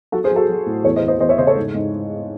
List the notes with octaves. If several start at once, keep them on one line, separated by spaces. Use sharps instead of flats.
F#3 F#4 A4
G#4 C5
F#3
F#4 A4
F#3
A2
E2 A4 C#5
C5 D#5
E2
C5 D#5
E2 C5 D#5
C#5 E5
C#3 C5 D#5
A4 C#5
G#2
G#2